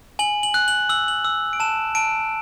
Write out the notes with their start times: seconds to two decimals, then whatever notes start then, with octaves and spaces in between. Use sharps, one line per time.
0.19 G#5 F#7
0.43 F#7
0.54 F#6
0.68 F#7
0.89 E6 F#7
1.08 F#7
1.25 E6
1.53 D7
1.60 A5 E7
1.95 A5 D7